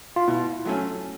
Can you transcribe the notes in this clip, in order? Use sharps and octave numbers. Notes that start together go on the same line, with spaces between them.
F4
B2 E4
F#3 A3 C#4